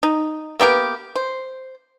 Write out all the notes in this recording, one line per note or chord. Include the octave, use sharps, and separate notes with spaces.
D#4
A#3 B3 G4 A#4
C5